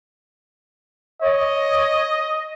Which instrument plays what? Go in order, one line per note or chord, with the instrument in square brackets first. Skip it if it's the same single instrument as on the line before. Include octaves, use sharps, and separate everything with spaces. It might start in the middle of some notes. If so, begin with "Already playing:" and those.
[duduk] C#5 [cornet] D#5